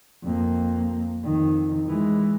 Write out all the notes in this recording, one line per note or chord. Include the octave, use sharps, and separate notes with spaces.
F2 A#3
F2 D#3
E3 G#3